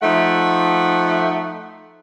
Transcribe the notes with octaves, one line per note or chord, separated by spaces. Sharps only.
F3 A3 D#4 F#5